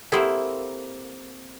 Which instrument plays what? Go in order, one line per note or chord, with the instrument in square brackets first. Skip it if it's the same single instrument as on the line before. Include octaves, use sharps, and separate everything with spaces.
[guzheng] A#3 C4 E4 [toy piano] G4 A4 F#5